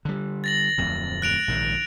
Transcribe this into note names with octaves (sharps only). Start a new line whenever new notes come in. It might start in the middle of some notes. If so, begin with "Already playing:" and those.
D3 G3
A6 A#6 F#7
D1 F2 A2
F#6 D7 F7
A#1 G#2 D#3